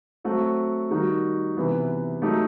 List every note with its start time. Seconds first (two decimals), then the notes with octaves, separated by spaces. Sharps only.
0.24 F#3 A3 C4 F#4
0.91 D#3 G3 D#4 F#4
1.57 C3 E3 B3
2.22 F#3 A3 D#4 G4